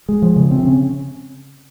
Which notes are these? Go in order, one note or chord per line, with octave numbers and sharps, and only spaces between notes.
G#3
F3
C#3
C4
C#3